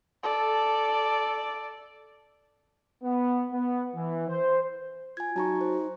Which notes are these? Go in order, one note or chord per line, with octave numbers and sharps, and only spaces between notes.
A4 D5
B3
B3
E3
C5
F4 G#5 G#6
F#3 D#4 A5 A#5 C#6
C5